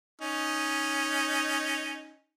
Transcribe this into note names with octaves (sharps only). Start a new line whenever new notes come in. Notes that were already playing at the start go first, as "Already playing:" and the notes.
C#4 D#4